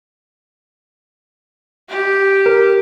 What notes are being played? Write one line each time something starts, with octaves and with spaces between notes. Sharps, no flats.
G4
A#4